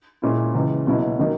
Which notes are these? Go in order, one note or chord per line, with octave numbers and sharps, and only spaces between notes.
A#2 G#3 C#4 E4
C#2 C#3 E3
C#2 B2 F#3 C#4 E4
D#3 F#3 A#3